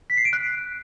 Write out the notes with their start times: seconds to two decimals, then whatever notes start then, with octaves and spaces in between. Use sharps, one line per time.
0.10 B6
0.17 C7
0.25 D7
0.33 F#6